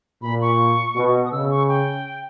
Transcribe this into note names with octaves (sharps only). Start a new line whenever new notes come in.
A#2 B5
C#6
B2
D#6
C#3 E6
C#6
G5